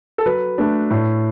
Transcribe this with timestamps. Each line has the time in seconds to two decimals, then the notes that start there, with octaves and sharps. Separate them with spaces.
0.18 A4
0.26 F#3 B4
0.58 A3 D4
0.90 A2